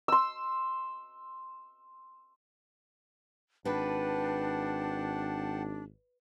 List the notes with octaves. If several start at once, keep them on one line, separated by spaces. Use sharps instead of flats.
C6 E6
G#1 D4 B4 F#5 G5 A5